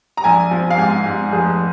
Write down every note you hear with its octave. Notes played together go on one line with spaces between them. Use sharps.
A#5
A#1 G#5
F3
F5
G#2 G#5
G#2
F1 G#4